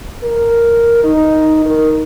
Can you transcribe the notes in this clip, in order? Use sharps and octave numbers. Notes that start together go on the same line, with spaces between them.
A#4
D#4
A#4